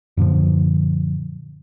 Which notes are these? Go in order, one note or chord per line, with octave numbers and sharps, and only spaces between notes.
F#2 A#2 D3 F3